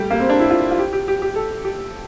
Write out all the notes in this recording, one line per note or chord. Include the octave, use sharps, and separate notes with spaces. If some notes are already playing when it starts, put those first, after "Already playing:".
Already playing: G3 A3 G4
A#3
C4
D4
E4
F4
F4
G4
G4
G4
G4
A4
G4